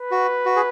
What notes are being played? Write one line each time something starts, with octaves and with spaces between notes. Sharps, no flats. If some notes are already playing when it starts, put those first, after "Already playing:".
Already playing: B4
F#4
F#4
G#4